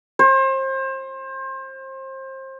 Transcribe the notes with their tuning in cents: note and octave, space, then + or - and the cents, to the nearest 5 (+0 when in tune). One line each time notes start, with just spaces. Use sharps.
C5 +30